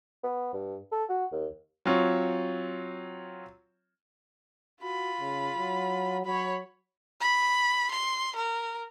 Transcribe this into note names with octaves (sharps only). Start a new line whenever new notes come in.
B3
G2
A4
F#4
D#2
F#3 C4 F4 C#5
F4 F#4 B5
C#3
F#3
F#3 C#5 B5
B5
C6
A#4